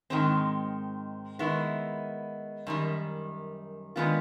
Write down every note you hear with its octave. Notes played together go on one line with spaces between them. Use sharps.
G#2 D#3 G#3 C4
D#3 G#3 B3 E4
F#2 D#3 G3
D#3 G#3 B3 D4 F4